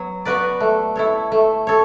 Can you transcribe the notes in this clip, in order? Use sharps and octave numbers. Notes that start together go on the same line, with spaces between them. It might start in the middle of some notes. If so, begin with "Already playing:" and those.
Already playing: F#3 B3
B3 F#4 B4 D5
A3
E4 A4 C#5
A3
A4 C#5